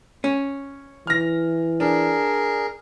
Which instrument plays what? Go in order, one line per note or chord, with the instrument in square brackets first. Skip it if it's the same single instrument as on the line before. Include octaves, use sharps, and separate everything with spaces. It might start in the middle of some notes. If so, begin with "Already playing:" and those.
[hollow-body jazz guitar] C#4
[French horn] E3 [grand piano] F6 A#6
[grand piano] D4 [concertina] G#4 A#4